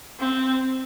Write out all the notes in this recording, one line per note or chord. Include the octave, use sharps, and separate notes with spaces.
C4